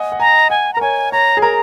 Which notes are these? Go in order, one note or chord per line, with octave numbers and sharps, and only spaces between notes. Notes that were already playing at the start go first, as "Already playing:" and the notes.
Already playing: D#5 F#5 G#5
F#5
G#5 A#5
F#5 G#5
A#5
A#4
C#5 G#5
C#5 A#5
G#4
A#4 A#5